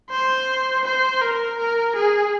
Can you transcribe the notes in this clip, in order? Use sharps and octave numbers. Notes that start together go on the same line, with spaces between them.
C5
C5
A#4
A#4
G#4